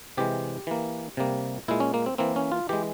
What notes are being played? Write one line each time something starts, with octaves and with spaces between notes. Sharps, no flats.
C3 E3 G#3 G4
E3 A#3
C3 G3 A#3
A#2 G#3 E4
C#4
A#3
C4
E3 A#3 C4
C#4
F4
E3 G#3 G4